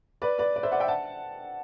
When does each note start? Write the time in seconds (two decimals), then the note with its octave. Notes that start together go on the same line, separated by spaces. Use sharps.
0.22 B4 D5
0.38 B4 D5
0.56 D5
0.63 C5 E5
0.71 D5 F#5
0.80 E5 G5
0.88 F#5 A5